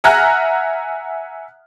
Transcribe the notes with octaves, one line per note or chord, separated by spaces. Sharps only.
E5 F#5 G#5 A#5 F6 F#6